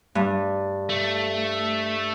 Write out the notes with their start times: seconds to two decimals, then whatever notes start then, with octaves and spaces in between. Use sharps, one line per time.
0.15 G2
0.89 A3